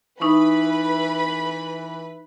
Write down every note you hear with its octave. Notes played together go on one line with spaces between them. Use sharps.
E3 D#4 E4 B4 B5 C#6